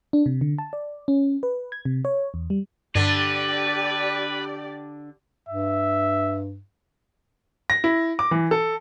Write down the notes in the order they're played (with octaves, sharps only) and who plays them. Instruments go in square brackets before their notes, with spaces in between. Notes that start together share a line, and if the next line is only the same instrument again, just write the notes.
[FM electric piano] D4
C3
D3
A5
D5
C#4
B4
G#6
C3
C#5
E2
G3
[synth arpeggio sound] G2 G#6 A#6 [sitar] D3 D4 [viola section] G4 D5 [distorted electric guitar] B4
[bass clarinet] G2 [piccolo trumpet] E5
[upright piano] A#6
E4
D6
E3
A4